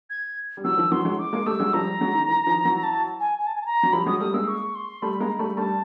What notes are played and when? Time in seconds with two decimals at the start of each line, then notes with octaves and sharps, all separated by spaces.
0.10 G#6
0.57 G3
0.64 E3 F#3 E6
0.78 D#3 F3
0.92 E3 F#3 C6
1.05 F#3 G#3
1.19 D6
1.33 G#3 A#3
1.46 G3 A3 E6
1.60 F#3 G#3
1.73 F3 G3 A#5
2.01 F#3 G#3
2.15 D#3
2.28 E3
2.46 D#3 F3
2.65 E3 F#3
2.83 A5
3.20 G#5
3.38 G#5
3.47 A5
3.55 G#5
3.61 A5
3.66 A#5
3.83 F#3
3.93 F3 G3 B5
4.07 F#3 G#3 D#6
4.20 G3 A3 D#6
4.34 G#3 A#3 E6
4.48 C#6
4.75 C6
5.02 G3 A3 B5
5.20 G#3 A#3 A#5
5.39 G3 A3 B5
5.57 G3 A3 A5